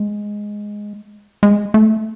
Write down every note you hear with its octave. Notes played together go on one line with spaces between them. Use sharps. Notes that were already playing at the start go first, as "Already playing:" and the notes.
Already playing: G#3
G#3
A3